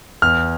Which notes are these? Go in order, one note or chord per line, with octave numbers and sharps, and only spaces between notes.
E2 F6